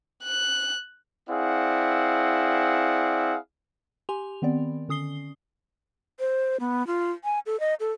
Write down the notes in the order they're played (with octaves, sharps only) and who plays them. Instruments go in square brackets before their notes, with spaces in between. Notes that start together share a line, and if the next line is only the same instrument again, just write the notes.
[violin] F#6
[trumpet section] C4 E4 G#4 D5 F5 F#5
[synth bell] G4 G#5 C6 F7
D#3 B3 C4 D5
D3 C#4 D#6 C7 G7
[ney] C5
B3
F4
G#5
A4
D#5
A4